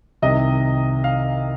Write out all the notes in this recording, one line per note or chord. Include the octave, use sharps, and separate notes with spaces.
C2 C3 D#3 D#5
F5